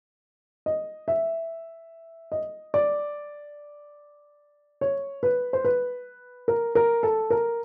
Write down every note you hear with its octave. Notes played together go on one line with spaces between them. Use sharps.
D#5
E5
D#5
D5
C#5
B4
C5
B4
A#4
A#4
A4
A#4